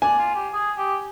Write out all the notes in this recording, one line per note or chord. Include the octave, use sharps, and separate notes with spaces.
D4 G#5
F4
G4
G#4
G4